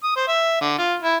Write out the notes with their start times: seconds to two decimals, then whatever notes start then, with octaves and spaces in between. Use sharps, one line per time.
0.03 D#6
0.16 C5
0.27 E5
0.61 D3
0.78 F4
1.02 E4